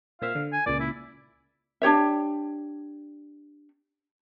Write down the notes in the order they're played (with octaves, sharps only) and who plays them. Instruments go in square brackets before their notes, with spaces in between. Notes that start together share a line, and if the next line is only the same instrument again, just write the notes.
[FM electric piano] A#2 C4 E5 [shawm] F5
[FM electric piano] D3
[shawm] G#5
[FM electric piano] C#2 A#2 [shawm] D5
[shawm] E4
[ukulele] D4 G4 C#5 E5